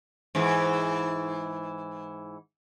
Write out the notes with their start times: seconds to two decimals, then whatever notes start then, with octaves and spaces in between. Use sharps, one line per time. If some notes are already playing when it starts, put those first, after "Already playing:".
0.35 G#2 E3